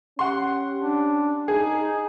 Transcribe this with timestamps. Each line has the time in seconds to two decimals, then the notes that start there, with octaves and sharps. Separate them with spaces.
0.19 C#4 G4 F#5 C6
0.83 D4
1.48 D#4 G#4